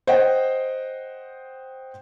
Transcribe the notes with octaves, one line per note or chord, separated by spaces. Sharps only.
C5 D#5 F#5 G5